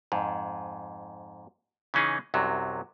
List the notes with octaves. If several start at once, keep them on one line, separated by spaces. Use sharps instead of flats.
F2 G#2
C#3 E3 C#4 D#4 G#4
C2 F#2 C3 F#3